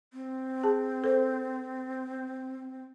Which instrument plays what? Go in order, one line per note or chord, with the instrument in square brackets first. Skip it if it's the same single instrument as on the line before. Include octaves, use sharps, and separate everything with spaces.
[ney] C4
[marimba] G#4 A5
A4 C5